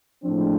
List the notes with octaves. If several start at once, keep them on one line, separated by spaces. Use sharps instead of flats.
A2 F3 G#3 C4 D4